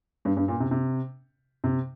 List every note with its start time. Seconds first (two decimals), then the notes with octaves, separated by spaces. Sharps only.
0.25 G2
0.37 G2
0.48 A#2
0.60 C3
0.71 C3
1.64 C3